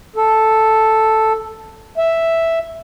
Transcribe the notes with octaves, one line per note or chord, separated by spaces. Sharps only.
A4
E5